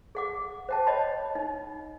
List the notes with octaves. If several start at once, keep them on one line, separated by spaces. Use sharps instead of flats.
G#4 F#5 D6
C5 G5 A5
C#5 D#5 G5 A5 B5
D#4